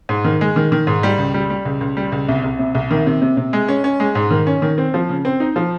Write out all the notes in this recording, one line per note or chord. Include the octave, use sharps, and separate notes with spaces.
G#2
D#3
G#3
D#3
D#3
G#2
G3
C#2
G3
G3
C#2
C#2
G3
C#2
C2
C2
C3
C2
D#3
C3
C3
C3
G#3
C#4
C#4
G#3
G#2
D#3
C#4
D#3
C4
F3
C#3
C4
D#4
F3